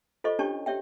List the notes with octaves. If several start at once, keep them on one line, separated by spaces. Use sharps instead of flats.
F4 A4 C5 D#5 C#6
C#4 D4 G4 C#5 A5 C#6
G4 C#5 E5 G5